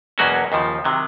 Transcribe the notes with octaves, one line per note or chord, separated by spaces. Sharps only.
E2 B2 F#3 A#3 C#4 F#4
D#2 C#3 F3
C3 D#3 F#3